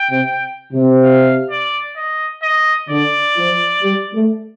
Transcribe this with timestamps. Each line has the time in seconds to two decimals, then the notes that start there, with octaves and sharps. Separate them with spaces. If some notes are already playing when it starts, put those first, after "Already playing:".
Already playing: G5
0.11 C3
0.73 C3
1.04 F5
1.50 D5
1.97 D#5
2.43 D#5
2.90 D3 D5
3.36 F3
3.82 G3
4.14 A3